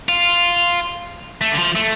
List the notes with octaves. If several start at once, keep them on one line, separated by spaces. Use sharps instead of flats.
F4
A3
D3
F3
A3